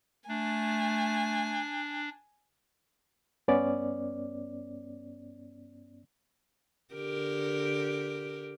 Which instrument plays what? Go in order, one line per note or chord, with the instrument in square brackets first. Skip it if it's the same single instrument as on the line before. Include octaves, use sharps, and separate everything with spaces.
[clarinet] A3 [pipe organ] D4 [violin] G#5
[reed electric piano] G2 B3 C#4 D5
[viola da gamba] D3 G4 A#4